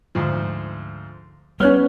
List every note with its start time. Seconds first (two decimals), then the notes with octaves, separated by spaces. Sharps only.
0.15 D2 G#2 F3
1.60 G3 B3 C#4 C#5 F6 F#6